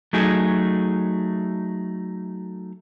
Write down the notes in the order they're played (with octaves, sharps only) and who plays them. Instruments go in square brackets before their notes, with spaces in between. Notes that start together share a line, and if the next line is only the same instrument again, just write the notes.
[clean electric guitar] F#3 A3 D#4 G#4